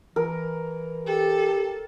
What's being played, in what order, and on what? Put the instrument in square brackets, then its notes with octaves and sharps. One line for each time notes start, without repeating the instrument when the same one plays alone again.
[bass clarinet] E3 [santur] A#4
[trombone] G4 [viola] A4